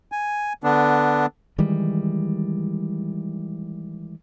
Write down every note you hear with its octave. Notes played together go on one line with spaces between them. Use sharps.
G#5
D3 B3 D4
D#3 E3 G3 G#3